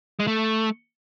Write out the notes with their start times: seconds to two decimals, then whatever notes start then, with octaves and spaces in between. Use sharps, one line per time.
0.20 G#3
0.27 A3